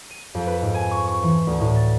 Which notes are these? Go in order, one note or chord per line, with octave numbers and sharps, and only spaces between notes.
D#7
F2
B4
G#2
G#5
C#6
C#6
E3
D2
A2
A6